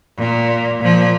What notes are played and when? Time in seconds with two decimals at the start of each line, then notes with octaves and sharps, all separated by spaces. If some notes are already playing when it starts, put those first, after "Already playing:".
0.18 A#2
0.81 A#2 F3